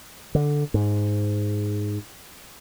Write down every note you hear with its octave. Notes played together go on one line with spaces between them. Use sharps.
D3
G#2